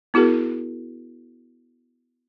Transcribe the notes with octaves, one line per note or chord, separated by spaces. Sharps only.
B3 E4 F#4 G#4 A#4